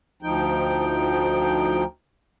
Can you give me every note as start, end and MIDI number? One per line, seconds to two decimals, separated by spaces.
0.22 1.84 38
0.22 1.84 53
0.22 1.84 63
0.22 1.84 79